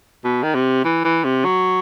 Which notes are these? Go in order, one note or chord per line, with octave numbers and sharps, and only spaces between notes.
B2
D#3
C3
E3
E3
C3
F#3